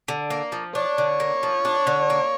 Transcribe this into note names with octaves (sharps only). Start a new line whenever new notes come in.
D3
A#3
F3
D4 C#5
D3
A#3
F3
D4
D3
A#3